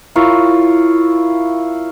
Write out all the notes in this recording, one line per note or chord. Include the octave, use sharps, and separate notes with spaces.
E4 F4 A#4 C#5